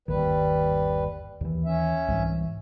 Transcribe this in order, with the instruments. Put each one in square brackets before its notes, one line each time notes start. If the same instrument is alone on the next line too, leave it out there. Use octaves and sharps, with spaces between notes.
[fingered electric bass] G1 D#2 D#3 [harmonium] G3 B4
[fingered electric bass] D#2 E3
[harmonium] C#4 E5
[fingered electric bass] C2 G#2 E3